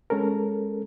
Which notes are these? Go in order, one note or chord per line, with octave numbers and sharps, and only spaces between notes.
G#3 C#4 A4 A#4